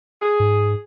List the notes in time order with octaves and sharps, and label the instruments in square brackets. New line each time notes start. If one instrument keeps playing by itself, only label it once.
[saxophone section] G#4
[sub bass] G#2